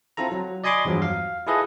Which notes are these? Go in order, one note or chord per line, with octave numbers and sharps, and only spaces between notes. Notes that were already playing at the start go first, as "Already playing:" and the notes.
C4 E4 F4 A4 A#5
F#3
D5 D#5 G#5 B5 C6 D6
E2 G2 F3 F#3
F5
E4 F4 G#4 A4 B4 D#5